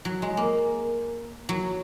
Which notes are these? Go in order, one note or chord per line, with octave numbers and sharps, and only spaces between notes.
F#3
G#3
A#3
F#3